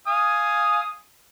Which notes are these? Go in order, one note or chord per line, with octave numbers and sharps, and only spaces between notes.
F5 G#5 D#6